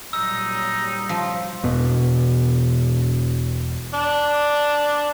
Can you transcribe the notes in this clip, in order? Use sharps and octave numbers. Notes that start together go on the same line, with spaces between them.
A#2 F#3 G3 D#4 E6
F3
E1 B2
D4